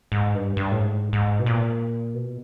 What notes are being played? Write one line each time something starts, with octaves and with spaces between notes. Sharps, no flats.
G#2
G2
G2
A2
G#2
G#2
B2
A#2
B2